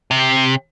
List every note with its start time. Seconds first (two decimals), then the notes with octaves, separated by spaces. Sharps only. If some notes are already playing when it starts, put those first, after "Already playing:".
0.11 C3